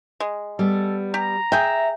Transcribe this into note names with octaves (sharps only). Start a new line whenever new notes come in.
G#3
G3 B3 A4
G4 A#5
G#4 E5 G5